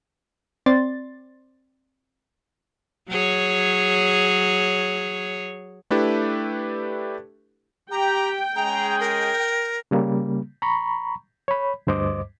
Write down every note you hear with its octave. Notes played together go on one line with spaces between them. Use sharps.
C4 D5 C6 A6
F#3 G#4 C#5
A3 D4 E4 G4 A4 B4
G4 G5 A#5
G#3 C#4 G#4 A#5
A#4
C#3 G3 A#3
A#5 B5 C#6
C#5 B5
D2 G2 C5 D#5 D6